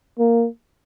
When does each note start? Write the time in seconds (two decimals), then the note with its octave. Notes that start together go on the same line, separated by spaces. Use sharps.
0.19 A#3